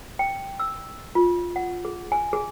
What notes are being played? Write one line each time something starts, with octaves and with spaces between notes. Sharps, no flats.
G5
E6
F4
F#5
G#4
G#5
G#4